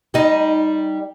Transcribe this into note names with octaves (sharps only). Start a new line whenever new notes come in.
G3 D#4